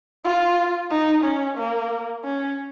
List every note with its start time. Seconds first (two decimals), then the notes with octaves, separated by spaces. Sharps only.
0.24 F4
0.91 D#4
1.24 C#4
1.57 A#3
2.24 C#4